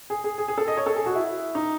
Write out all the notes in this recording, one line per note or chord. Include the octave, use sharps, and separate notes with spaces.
G#4
G#4
G#4
G#4
A4
D#5
C#5
A4
G#4
F#4
E4
D#4